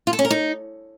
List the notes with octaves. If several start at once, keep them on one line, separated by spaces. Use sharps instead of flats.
F4
A4
C#4
A#4
D#4